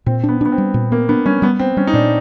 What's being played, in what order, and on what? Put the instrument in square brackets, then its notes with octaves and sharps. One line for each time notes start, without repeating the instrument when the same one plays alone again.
[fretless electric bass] A#2 [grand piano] C4
[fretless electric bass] D4
[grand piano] B3
[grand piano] B3 [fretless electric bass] D4
[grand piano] C4
[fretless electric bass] G3
A#2
[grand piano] A#3 [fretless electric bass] B3
[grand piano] B3 [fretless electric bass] D4
[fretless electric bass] G3 [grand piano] C#4
[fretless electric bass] G3 [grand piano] B3
[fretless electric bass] B3 [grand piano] C4
[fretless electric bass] G3 [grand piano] C#4
[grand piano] D#4
[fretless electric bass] A#2 [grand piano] D4